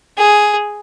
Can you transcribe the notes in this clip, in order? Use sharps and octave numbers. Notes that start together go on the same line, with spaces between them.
G#4